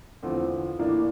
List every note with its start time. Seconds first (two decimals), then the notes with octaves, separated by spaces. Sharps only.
0.23 E2 D3 F3 A3 C4
0.79 A2 E3 A#3 D4